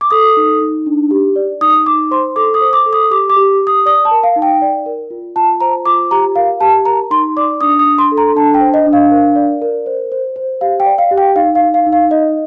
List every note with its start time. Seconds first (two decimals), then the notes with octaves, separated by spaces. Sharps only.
0.01 D6
0.11 A4 D#6
0.37 D#4
0.61 D#4
0.86 D4
1.11 G4
1.36 D5
1.61 D#4 D#6
1.86 D#4 D6
2.11 C5 C6
2.36 A4 D6
2.54 D#6
2.61 C5
2.73 D6
2.86 A4
2.93 D#6
3.11 G4 D6
3.30 D6
3.36 G4
3.61 G4
3.67 D#6
3.86 D5 D#6
4.05 A5
4.11 A#4
4.23 F5
4.36 D#4
4.42 G5
4.62 D5
4.86 A#4
5.10 F4
5.36 F4 A5
5.60 C5 A#5
5.86 F4 D6
6.11 G4 A#5
6.36 A#4 F5
6.60 G4 A5
6.85 A#4 A#5
7.10 D#4 C6
7.37 D5 D6
7.61 D4 D#6
7.79 D#6
7.85 D4
7.98 C6
8.12 A4
8.18 A#5
8.35 D4 A5
8.54 G5
8.60 C5
8.74 D#5
8.86 D4
8.93 F5
9.11 A#4
9.35 D5
9.62 A#4
9.86 C5
10.12 C5
10.36 C5
10.61 G4 F5
10.80 G5
10.86 D5
10.98 F5
11.11 G4
11.18 G5
11.36 D#4 F5
11.55 F5
11.61 D#4
11.74 F5
11.86 D#4
11.93 F5
12.11 D#4 D#5